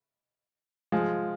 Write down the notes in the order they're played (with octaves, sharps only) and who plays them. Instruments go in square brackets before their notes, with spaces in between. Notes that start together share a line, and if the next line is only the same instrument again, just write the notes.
[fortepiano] F3 G#3